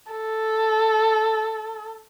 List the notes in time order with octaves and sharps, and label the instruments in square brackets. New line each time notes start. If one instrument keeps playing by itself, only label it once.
[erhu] A4